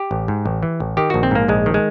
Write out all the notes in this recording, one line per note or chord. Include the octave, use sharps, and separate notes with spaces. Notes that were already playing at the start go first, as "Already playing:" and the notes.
Already playing: G4
A1
G#2
A1
E3
A1
D#3 G4
A#1 F#4
C4
G#2 A#3
A#1 G#3
D#3
G#3